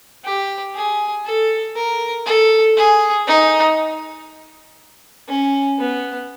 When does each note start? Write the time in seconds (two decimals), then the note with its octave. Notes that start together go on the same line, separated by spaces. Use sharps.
0.24 G4
0.75 G#4
1.25 A4
1.75 A#4
2.26 A4
2.77 G#4
3.27 D#4
5.28 C#4
5.79 B3